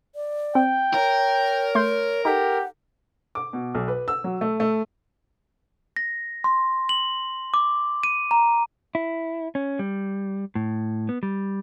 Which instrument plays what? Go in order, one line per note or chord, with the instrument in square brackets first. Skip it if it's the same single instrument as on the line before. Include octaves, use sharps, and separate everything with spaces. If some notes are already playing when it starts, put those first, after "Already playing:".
[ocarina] D5
[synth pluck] C4 [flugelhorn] G5
[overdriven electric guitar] A#4 [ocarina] C#5
[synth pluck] A3 C6 G6
[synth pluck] D#4 A4 [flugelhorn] G4 [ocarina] F#5
[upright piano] D6
B2
B1
B4
E6
F#3
A3
A3
[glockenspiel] A#6
C6
F#7
D6
D#7
A#5
[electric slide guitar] E4
C#4
G3
A2
B3
G3